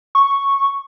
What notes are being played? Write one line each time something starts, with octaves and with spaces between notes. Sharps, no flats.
C#6